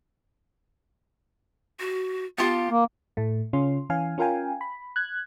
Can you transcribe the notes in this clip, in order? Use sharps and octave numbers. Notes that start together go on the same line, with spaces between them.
F#4
B3 F4 G4 A5
A#3
A2 A3
C#3 C#4 F4 C6
E3 C#4 F5 G#5
C#4 F4 A#4 F5 G5 G#5
B5
F#6 G#6